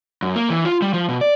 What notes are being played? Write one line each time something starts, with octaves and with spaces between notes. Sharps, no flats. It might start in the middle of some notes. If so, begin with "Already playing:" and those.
F#2
A#3
E3
F4
G3
F3
B2
D5